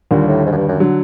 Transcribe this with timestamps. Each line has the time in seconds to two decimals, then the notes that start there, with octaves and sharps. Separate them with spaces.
0.11 D#2 A#2 D3 G3
0.28 A2
0.46 G#2
0.52 F#2
0.57 G2
0.68 F#2
0.80 D3 F#3